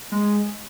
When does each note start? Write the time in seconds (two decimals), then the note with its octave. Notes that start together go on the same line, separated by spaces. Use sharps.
0.12 G#3